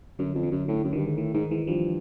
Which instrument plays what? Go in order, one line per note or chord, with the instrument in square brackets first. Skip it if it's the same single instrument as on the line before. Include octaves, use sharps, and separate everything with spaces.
[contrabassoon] F#2 [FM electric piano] D3
[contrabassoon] F2
[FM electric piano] D3
[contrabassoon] F#2
[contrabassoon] A2 [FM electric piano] D3
[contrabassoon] F#2
[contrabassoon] G2 [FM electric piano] D#3
[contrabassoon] G#2
[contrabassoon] A2 [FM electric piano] D#3
[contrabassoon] G#2 [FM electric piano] D#3
[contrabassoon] G#2 [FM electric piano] E3
[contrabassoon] G2 [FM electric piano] F3